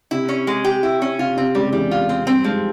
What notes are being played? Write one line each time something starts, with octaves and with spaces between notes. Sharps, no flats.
C3 E4
C#4
G#3
G4
E4
C#4
C3 F4
C3 C4
C#2 C#3 G3
E2 E3 G3
F4
C4
G2 G3 C4
G#2 F3 G#3